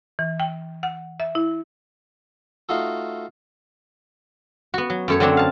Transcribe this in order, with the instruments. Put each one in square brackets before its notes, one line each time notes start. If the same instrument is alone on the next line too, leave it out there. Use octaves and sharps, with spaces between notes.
[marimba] E3
G5
F#5
E5
E4
[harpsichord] A3 D#4 F4 F#4 A4
[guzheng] B3 F#4
F#3
F#2 A3 C#5
D3 F#3 A3 C4 D4 C#5
F5 A5